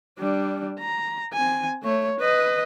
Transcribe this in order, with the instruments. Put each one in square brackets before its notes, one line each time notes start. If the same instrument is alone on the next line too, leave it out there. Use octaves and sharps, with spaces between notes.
[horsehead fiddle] G3 D4
A#5
C4 G#5
A3 C#5
B4 D#5